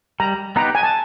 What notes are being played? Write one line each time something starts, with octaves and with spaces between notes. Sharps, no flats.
G3 A#5
B3 D#4 G4 B4 A#5
G#5
A5